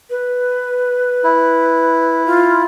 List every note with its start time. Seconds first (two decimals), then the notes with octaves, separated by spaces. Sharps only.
0.10 B4
1.24 E4
2.26 F4